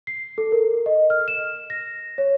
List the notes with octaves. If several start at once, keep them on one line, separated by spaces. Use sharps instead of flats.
C7
A4
A#4
D#5
F6
E7
A#6
C#5